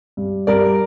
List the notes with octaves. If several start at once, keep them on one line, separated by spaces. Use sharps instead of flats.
G2
G2 A#4 D5